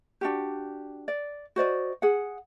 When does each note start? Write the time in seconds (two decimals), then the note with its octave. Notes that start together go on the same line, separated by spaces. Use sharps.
0.21 D4 F#4 G4
1.08 D5
1.56 F#4 C5 D5 D#5
2.02 G#4 F#5